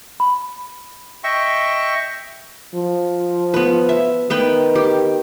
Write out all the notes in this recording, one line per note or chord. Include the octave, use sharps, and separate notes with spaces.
B5
D#5 E5 G5 C#6
F3
B3 B4
E5
D#3 B3 B4 G5
G4